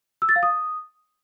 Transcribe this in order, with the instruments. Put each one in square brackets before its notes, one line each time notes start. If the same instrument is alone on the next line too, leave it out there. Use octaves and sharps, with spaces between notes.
[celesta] E6
A6
F5
D#6